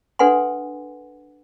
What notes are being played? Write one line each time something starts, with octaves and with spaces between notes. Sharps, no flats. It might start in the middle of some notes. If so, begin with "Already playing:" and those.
D4 A4 B4 F#5 G#5 C6